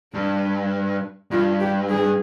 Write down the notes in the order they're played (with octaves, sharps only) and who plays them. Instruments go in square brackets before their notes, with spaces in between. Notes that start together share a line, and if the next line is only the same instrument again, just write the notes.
[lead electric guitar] G2 [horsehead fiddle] D4
[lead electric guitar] G2 [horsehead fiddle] F4
[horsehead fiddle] G4
G#4